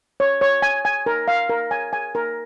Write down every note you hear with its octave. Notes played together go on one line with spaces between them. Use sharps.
C#5
C#5
G#5
G#5
A#4
F5
A#4
G#5
G#5
A#4